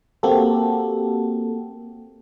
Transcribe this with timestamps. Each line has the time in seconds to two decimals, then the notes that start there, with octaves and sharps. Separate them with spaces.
0.23 A#3 C4 F#4 G4 A4